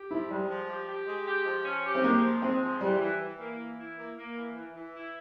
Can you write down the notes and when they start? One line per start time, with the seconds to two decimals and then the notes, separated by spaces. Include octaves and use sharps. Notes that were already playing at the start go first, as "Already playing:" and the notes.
Already playing: G4
0.11 F3 E4
0.30 G3 G#3
0.49 F3
0.68 G4
0.89 G4
1.07 G#3
1.26 G4
1.46 F3
1.65 C#4
1.85 G4
1.95 C4
2.03 G#3 A#3
2.24 F3
2.42 G#3 C4
2.62 F3
2.81 E3 G3
3.01 E3
3.21 E3
3.39 A#3
3.59 E3
3.78 E4
3.97 A#3
4.17 A#3
4.35 E3
4.55 E3
4.75 E3
4.94 E4